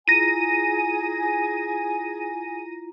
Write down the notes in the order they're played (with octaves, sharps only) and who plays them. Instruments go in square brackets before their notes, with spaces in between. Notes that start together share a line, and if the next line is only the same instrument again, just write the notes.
[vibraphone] E4 F4 A#5 [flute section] G#4 G#5 [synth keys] A#6 D#7